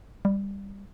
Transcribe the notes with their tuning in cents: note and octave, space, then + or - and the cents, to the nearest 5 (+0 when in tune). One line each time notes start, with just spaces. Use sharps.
G3 +15